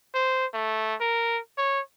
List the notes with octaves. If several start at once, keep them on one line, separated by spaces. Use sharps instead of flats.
C5
A3
A#4
C#5